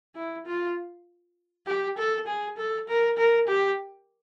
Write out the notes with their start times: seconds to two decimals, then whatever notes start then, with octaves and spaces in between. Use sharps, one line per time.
0.15 E4
0.46 F4
1.66 G4
1.97 A4
2.27 G#4
2.57 A4
2.88 A#4
3.17 A#4
3.48 G4